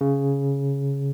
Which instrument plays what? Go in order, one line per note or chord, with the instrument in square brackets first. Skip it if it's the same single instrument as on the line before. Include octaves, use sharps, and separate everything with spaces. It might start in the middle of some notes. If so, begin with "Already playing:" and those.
[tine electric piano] C#3